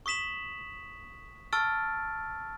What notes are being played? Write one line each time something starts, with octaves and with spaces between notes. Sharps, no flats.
C#6 D#6 B6 E7 F#7
A5 C#6 E6 F6 A6 D7